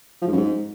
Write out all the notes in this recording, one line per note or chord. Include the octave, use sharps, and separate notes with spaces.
F3
G#2
F#2
G#2